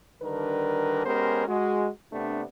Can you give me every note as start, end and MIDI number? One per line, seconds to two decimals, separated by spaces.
0.22 1.02 50
0.22 1.02 51
0.22 1.02 55
0.22 1.02 62
0.22 1.02 70
0.22 1.02 71
1.05 1.45 56
1.05 1.45 59
1.05 1.45 61
1.05 1.45 67
1.05 1.45 70
1.05 1.45 72
1.47 1.88 56
1.47 1.88 66
2.12 2.43 48
2.12 2.43 57
2.12 2.43 59
2.12 2.43 62